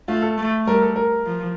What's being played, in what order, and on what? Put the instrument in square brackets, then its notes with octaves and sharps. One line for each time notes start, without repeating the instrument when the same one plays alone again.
[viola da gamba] A3 [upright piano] F4
[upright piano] A4
[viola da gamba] A3
[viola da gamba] G3 [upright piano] A#4
[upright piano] A4
A#4
[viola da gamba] F3